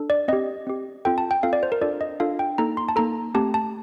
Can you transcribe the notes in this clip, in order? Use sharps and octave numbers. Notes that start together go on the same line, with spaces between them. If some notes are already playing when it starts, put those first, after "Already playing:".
Already playing: D4 A4
D5
C4 G4 D#5
C4 G4
C4 F4 A4 G5
A5
G5
C4 F4 A4 F5
D5
C5
A#4
D4 F4 A4 D5
D#5
D4 F4 A4 F5
G5
A#3 D#4 A4 A#5
C6
A5
A#3 D#4 A4 A#5
A3 C4 G4 A5
A5